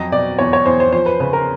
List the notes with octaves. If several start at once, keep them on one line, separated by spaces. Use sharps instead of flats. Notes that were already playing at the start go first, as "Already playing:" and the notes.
Already playing: F2 F#3 D#5
B2 D5
E2 C#5
C#5
E2 C5
C5
F3 C5
B4
C#3 B4
A#4